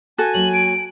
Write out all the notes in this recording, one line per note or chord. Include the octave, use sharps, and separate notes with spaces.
F#4 A4 G#5
F#3 A3 A#3 F#7
D7